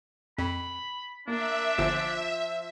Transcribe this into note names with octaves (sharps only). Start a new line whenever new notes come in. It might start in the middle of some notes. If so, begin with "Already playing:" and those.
F2 B5
A#3 D4 E5
G1 F3